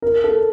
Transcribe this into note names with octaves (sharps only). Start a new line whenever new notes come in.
A#4
A4